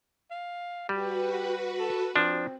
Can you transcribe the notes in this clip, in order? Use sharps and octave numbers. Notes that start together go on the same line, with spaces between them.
F5
G3 F#4 G4 B4
A4
F3 C4 D4